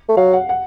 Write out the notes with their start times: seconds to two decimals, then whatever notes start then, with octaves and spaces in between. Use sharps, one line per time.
0.09 A3
0.17 F#3 F5
0.33 F#5
0.49 F#5